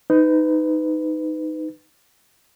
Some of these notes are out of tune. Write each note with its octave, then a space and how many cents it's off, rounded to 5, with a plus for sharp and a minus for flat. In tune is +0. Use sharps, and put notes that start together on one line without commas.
D#4 +0 B4 +25